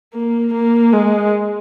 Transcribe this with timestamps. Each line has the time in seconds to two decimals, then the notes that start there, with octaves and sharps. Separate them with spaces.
0.14 A#3
0.53 A#3
0.93 G#3